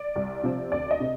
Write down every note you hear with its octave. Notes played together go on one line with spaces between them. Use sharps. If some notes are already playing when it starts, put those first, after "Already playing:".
Already playing: D5
C2
C3 F3 C4
D2 D5
D#5
C3